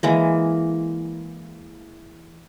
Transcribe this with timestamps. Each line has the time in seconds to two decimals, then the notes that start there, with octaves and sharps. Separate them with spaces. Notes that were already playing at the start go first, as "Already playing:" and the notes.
0.03 E3 G#3 A#3